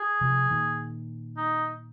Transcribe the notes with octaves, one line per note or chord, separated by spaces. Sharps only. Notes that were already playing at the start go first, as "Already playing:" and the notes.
Already playing: G#4
C3 F3
A#2 D#3
D#4